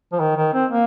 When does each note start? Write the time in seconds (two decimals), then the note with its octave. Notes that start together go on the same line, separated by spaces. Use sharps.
0.12 F3
0.20 D#3
0.37 D#3
0.53 C4
0.71 A#3